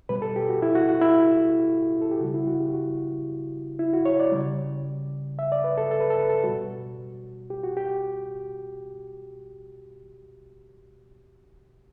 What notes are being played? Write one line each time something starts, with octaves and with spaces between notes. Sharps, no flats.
B2 G3 B4
A4
G4
F#4
E4
F#4
F#4
E4
A4
G4
C#3 G3 F#4
E4
F#4
G4
F#4
E4
F#4
C#5
D5
C#3 G3
E5
D5
B4
A4
A4
B4
A4
B4
A4
B2 G3 F#4
G4
F#4
G4